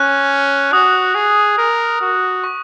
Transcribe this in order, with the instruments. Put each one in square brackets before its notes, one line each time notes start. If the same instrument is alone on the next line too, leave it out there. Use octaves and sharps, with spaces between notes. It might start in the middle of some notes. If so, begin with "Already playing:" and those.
Already playing: [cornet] C#4 [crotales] F#6
[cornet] F#4 [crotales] D#6
[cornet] G#4
A#4
F#4
[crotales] C#6